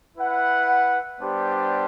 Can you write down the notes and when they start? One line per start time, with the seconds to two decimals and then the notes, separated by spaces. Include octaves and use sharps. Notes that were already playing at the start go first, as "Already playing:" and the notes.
0.17 E4 B4 F#5
1.19 G3 B3 D4 G4 C5